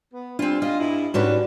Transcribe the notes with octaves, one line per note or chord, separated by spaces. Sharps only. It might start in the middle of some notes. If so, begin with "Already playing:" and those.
B3
G3 C4 D4 F4
F4 D#5
G2 E4
G#2 F#3 G3 C#4 D4 F#4 B4 D5